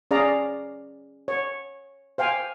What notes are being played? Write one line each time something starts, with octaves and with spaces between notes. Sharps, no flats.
C#4 G#4 D5 F5 A#5
C#5
C5 F5 G5 G#5